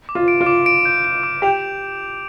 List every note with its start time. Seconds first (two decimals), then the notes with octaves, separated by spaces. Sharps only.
0.09 D6
0.15 F4
0.28 D7
0.41 F4
0.46 D6
0.66 D7
0.85 G6
1.04 D7
1.23 D6
1.42 G4 F7